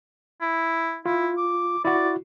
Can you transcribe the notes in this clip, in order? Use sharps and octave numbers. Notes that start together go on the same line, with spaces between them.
E4
E4 F4
D6
E4 F#4 D5